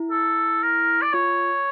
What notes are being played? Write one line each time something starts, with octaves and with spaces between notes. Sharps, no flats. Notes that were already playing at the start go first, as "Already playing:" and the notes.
Already playing: E4
A4
A#4
D5
F4 C#5